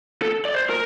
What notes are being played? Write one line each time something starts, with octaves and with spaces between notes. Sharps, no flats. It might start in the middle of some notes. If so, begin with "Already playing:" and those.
A4
D5
C5
A#4